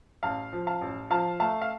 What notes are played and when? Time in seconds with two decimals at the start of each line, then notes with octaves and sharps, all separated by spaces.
0.23 A1 F5 A5
0.53 F3
0.67 F5 A5
0.81 A1
1.10 F3 F5 A5
1.40 A3 F5 A5
1.62 F5